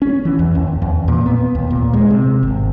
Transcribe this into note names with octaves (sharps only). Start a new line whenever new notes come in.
C#4
E3
E2
D#2
E2
A#2
B3
D#2
A#2
G#3
C3
G#1